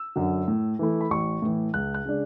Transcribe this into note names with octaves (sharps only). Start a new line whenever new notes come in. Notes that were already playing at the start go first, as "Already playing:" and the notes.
Already playing: E6
F#2 D3 F#3
A2
E3 A3 E4
B5
A1 C#6
A2 E3
C#2 F#6
F#6
C#3 G#3 D4